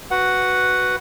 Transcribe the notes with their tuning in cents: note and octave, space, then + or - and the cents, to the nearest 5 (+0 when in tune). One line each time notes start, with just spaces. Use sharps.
F#4 +0 B4 +0 F#5 +0